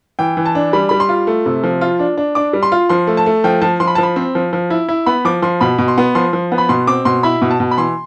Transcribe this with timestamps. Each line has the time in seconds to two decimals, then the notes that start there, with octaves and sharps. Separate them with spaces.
0.19 E3 G5
0.37 E3
0.46 A5
0.55 D4
0.73 G3 B5
0.89 G3 B5
1.00 C6
1.09 F4
1.27 A3
1.46 C3
1.63 F3
1.81 F4
1.99 D4
2.17 D4
2.35 D4 D6
2.53 G3
2.63 C6
2.72 F4
2.89 F3 C6
3.07 A3
3.17 A5
3.26 A3
3.44 F3 G5
3.62 F3 A5
3.80 F3 C6
3.87 B5
3.95 A5
3.98 F3 B5
4.16 C4
4.35 F3
4.53 F3
4.70 E4
4.89 E4
5.06 B3 B5
5.25 F3 D6
5.42 F3 C6
5.61 B2 B5
5.78 B2
5.88 C6
5.98 B3
6.15 F3 C6
6.33 F3
6.52 B3
6.58 B5
6.69 B2 C6
6.87 C4 D6
7.05 B2 C6
7.23 E4 B5
7.42 B2
7.51 A5
7.60 B2
7.71 B5
7.78 E3 C6